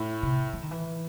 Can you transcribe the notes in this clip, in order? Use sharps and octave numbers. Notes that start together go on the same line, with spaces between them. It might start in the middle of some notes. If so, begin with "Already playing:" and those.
Already playing: A2
C3
E3
D#3
E3